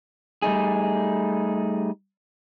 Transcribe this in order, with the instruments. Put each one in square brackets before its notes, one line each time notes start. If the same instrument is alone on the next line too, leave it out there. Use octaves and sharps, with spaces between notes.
[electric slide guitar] G3 A3 D#4 G#4